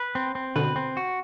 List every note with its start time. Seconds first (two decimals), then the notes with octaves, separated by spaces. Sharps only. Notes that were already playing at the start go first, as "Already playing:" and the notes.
Already playing: B4
0.15 C4
0.35 C4
0.56 B2 D3 B4
0.76 C4
0.97 F#4